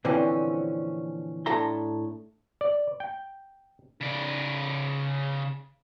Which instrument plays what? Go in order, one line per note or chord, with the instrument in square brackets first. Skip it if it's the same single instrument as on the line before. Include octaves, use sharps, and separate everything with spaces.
[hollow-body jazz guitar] A#2 D3 E3 F3 C4 C#4
A2 D4 A4 E5 A#5 C6
[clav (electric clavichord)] D5
G5
[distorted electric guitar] C#3 D5